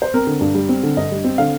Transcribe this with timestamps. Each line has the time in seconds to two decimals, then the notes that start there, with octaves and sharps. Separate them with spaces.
0.02 C5
0.14 C4 A#4
0.27 D3
0.41 G2
0.54 G3
0.69 C4
0.83 D3
0.97 G2 D#5
1.11 G3
1.24 C4
1.38 D3 F5